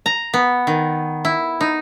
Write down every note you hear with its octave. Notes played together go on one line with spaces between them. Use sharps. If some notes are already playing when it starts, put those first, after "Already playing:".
A#5
B3
D#3
E4
D#4